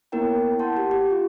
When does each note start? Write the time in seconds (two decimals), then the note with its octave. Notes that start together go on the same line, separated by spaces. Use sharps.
0.12 A#3 B3 E4 A#4 C#5 G5
0.59 F#5 A5 C6 G6
0.77 G4
0.91 G4
1.11 F4